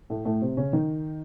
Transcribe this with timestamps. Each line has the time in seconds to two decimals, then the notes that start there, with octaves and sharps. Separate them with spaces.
0.10 A2 A3
0.25 A2 A3
0.41 C3 C4
0.57 C#3 C#4
0.73 D#3 D#4